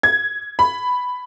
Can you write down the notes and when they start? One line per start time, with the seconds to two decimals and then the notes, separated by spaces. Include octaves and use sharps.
0.03 G#6
0.59 B5